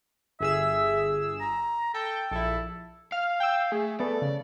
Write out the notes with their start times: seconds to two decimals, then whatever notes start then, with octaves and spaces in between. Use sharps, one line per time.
0.40 G1 G#4 E5 E6
1.41 A#5
1.94 A4 G5
2.31 A#1 E4 A4
3.12 F5 F6
3.40 G5 E6
3.72 A3 G#4
4.00 A3 B3 A4 D5
4.22 C#3